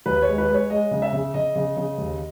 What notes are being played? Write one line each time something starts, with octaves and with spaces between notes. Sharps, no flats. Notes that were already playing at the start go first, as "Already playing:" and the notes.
D#2 B4
G#3 C#5
B4
G#3
C#5
G#3 D#5
C#3
E5
C#3
C#3 D#5
C#3
C#3
D#2